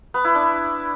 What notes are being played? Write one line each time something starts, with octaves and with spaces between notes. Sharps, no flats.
B3
E4
D4